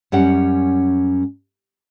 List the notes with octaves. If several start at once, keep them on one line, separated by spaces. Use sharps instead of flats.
F#2 G3 C#4 F#5